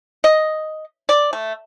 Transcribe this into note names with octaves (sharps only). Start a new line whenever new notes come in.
D#5
D5
A3